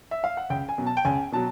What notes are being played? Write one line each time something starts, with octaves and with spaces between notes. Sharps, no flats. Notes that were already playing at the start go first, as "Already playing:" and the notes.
E5
F5
F#5
C#2 G5
G#5
B2 F#3
A5
G5
C#2 G#5
B2 F#3 A5